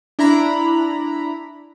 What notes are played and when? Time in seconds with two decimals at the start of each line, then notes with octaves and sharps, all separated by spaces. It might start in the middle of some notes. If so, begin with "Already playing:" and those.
0.19 D4 E4 A#5 B5